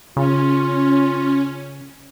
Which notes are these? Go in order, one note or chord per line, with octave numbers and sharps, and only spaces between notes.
C#3 C#4 F4